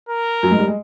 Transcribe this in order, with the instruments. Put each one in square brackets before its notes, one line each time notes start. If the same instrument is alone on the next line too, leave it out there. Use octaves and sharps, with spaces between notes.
[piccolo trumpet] A#4
[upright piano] F#2 F#3
G#2 G#3
G3
G#3